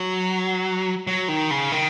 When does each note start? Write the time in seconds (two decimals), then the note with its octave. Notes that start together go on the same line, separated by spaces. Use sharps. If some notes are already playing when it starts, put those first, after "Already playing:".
Already playing: F#3
1.07 F#3
1.28 D#3
1.51 C#3
1.72 D#3